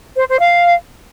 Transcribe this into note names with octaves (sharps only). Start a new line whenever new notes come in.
C5
C5
F5